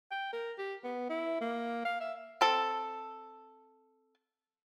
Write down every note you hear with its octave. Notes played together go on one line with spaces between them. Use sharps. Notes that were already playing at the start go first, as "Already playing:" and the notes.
G5
A#4
G4
B3
E4
A#3
F5
E5
C4 A4